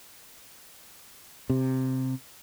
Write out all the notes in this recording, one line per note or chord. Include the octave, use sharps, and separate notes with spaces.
C3